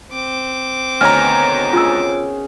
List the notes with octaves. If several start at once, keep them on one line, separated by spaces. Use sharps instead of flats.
C4 D6
D2 B2 D#3 C#5 G#5 A#5 F6
C#3 F4 G#4 E6